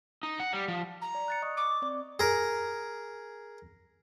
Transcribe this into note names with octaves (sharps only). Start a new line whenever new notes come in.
D#4
F#5
G3
F3
A#5
D5
F#6 A6 C#7
D#5 C#6 D#6
D6
C4 D5
G#4 A#4